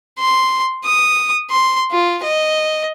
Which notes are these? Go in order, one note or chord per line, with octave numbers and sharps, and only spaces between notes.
C6
D#6
C6
F4
D#5